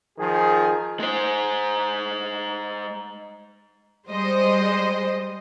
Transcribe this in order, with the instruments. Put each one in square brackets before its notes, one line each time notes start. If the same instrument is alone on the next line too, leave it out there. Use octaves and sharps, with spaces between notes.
[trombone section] D#3 F3 G#4
[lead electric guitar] G#3 C5
[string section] G3 G#3 C5 D#5